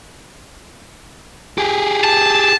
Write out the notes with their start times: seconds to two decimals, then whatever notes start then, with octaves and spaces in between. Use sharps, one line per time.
1.58 G4 G#4
2.04 A5